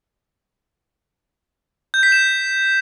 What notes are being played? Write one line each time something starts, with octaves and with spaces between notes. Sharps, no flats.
G6
B6
E7